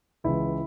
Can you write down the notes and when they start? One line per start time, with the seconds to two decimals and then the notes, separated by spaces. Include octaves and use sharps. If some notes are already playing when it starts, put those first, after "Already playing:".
0.24 C#2 C#3 E3 E4